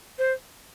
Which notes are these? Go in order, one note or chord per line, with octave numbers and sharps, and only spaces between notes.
C5